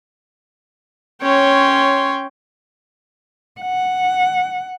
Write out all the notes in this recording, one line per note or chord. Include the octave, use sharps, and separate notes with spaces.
C#4 C#5 G5 C6
F#5